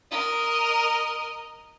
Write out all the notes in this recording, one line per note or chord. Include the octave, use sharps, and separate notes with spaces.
A#4 D#5